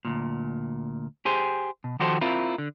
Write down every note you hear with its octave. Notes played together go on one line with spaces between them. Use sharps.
D2 A#2
G4 G#4 C5
B2
D#3 F3 F#4 G4 A4 C5
C4 E4 F4 A#4
D3